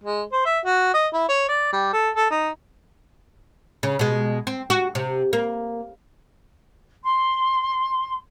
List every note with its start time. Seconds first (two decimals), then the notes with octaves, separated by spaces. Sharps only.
0.04 G#3
0.32 C5
0.46 E5
0.65 F#4
0.94 D#5
1.13 E4
1.29 C#5
1.48 D5
1.73 G3
1.93 A4
2.15 A4
2.31 D#4
3.83 C#3
3.99 B2 G#3
4.47 C4
4.70 F#4
4.95 C3
5.33 A#3
7.03 C6